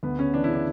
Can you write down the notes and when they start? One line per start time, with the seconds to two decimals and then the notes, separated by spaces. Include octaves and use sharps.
0.03 D2 B3
0.18 C#3 C#4
0.34 E3 D4
0.44 E4
0.49 C#3
0.54 D4